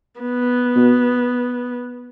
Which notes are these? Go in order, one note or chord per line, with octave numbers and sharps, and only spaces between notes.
B3
B2